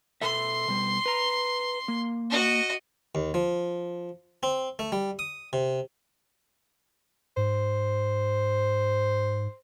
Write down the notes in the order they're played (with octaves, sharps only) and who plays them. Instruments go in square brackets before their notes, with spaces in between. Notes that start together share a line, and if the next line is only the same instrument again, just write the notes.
[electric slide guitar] B2 A4 E5 [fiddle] C6
[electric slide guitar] B2 G3
B4 A#5
A#3
[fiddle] F#4 D#5
[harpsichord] D#2
F3
C4
A3
G3
D#6
C3
[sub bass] G#2 [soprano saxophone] C5